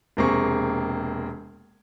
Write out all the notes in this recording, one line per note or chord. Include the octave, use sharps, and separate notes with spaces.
E1 C3 A#3 C4 G#4 C#6